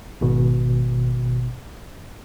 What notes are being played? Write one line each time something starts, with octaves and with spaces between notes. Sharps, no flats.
G#1 B2